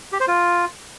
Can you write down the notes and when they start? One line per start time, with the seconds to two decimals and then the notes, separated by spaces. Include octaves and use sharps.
0.12 G4
0.20 C5
0.28 F4